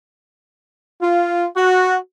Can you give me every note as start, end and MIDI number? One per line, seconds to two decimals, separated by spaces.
1.01 1.46 65
1.56 1.95 66